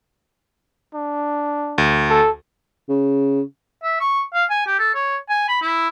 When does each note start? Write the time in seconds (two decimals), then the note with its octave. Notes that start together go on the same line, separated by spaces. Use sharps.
0.95 D4
1.78 D2
2.10 A4
2.89 C#3
3.83 E5
4.00 C#6
4.34 F5
4.50 G#5
4.66 G4
4.79 A4
4.95 C#5
5.29 G#5
5.48 B5
5.62 E4